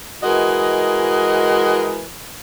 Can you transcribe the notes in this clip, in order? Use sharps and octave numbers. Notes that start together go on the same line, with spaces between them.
E3 G#3 F#4 A#4 D#5